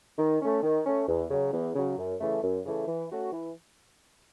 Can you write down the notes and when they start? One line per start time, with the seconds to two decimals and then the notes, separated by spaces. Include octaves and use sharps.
0.19 D#3
0.41 A3 C#4
0.63 D#3
0.86 A3 C#4
1.08 E2
1.30 C#3 F#3
1.53 E2
1.76 C#3 F#3
1.98 F#2
2.20 C#3 E3 A3
2.43 F#2
2.65 C#3 E3 A3
2.88 E3
3.10 A3 C#4 F#4
3.33 E3